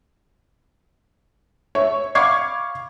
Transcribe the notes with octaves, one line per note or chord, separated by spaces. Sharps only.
C#5 E5
F5 B5 C#6 D6 G#6 C7